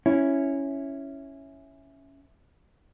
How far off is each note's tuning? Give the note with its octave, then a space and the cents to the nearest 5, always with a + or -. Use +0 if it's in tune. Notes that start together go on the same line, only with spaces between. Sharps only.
C#4 +0 E4 +0